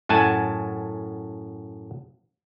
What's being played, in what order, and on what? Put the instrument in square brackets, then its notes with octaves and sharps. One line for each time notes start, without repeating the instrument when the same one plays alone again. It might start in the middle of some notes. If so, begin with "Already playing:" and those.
[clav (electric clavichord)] F#2 A2 F#5 G#5 A5